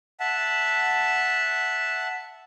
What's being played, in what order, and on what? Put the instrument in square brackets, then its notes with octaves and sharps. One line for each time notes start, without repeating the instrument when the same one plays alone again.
[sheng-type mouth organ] E5 F#5 A5